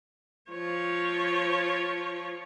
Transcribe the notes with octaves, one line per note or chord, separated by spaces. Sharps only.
F3 C#5